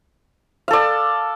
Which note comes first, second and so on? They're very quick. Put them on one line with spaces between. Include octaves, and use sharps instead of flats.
F5 A4 D5